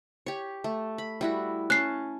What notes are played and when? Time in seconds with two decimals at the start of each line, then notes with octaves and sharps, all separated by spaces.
0.26 G4 C#5
0.64 A3
0.98 B5
1.21 G3 E4 F#4
1.70 C#4 A5 F#6 C7